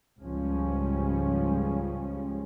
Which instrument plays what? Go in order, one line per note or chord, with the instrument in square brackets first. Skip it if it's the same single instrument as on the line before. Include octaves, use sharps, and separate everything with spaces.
[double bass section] C#2 G#2 F3 G3 G#3 C#4